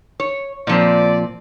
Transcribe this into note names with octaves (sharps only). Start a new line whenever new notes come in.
C#5
A#2 F3 C4 D5